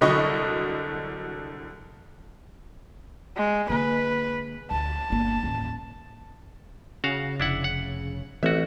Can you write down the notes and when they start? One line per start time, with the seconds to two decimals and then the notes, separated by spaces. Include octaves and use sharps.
0.01 C2 D3 F#3 D#5 B5 C#6
3.37 G#3
3.69 D3 A#3 B4
4.71 D2 A5
5.10 G1 A#3
5.43 A1 D#2
7.04 C#3 F#4 F5
7.40 F1 D4 E4 F#5
7.64 F#5
8.43 A1 E3 A3 C4 F#4 E5